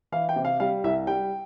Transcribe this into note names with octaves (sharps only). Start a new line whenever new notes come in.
E3 F5
G5
C3
F5
G3 F5
C2 E5
G3 G5